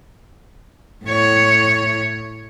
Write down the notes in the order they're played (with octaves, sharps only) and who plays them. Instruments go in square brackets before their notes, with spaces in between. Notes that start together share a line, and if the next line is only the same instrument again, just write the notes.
[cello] A2 C#5